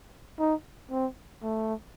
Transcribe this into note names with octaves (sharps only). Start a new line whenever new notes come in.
D#4
C4
A3